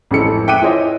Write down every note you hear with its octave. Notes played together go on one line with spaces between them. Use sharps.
A1 F2 E3 G#3 A4 C#7
E5 G5 D6 F#6 C#7 D#7
E4 F4 G#4 C5 C#5 D#5